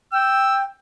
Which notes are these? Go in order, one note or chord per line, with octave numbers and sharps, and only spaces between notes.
G5 E6